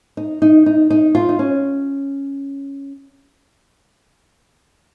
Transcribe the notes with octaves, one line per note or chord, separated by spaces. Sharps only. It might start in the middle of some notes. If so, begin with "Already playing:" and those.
D#4
D#4
D#4
D#4
F4
D#4
C#4